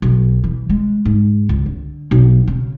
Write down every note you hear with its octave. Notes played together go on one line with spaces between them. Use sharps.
B1
E3
G#3
G#2
C#2
D3
B1
C#3